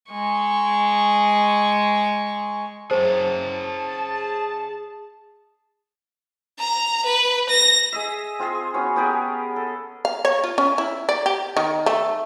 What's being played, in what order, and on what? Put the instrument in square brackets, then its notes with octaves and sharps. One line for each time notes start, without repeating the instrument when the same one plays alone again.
[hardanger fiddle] G#3 C#6
[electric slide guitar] G#4 C#5 G5 [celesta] C5 [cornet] A5
[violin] A#5
B4
A#6
[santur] G#4 D#5 E5
C4 F4 G#4 C6
B3 C#4 F#4 C#5
B3 G4 G#4 A#4
A4
[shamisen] F5
C#5
F4
C#4
E4
D5
G4
D#3
A3